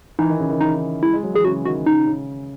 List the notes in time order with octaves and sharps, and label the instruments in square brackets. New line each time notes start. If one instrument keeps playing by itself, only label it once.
[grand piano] E3 [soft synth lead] D#4
[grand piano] D#3
C#3
D#3
[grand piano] E3 [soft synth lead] D#4
[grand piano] G#3 [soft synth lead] E4
[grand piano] G#3
F#3
[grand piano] E3 [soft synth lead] G#4
[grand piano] C#3 [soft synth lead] F#4
[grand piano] D#3 [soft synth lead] F#4
[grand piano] C#3 [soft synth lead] D#4
[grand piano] C#3